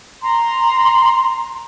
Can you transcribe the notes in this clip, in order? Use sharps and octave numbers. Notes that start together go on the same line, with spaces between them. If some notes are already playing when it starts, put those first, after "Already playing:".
A#5 C6